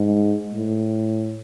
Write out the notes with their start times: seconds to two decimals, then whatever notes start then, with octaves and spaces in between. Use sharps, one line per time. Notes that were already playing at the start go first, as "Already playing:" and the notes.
Already playing: G#2
0.53 A2